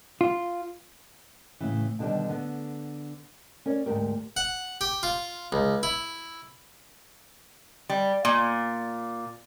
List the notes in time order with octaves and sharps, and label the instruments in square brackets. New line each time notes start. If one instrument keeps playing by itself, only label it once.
[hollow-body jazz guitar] F4
[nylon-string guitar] A2 C#3 E3
B2 D3 D#3 G3
D3 B3
C#4 A#4 C#5 D5
D2 G#2 G4 A#4
[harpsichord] F#5
G4
F4
C#2
E4
[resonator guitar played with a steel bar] G3
A#2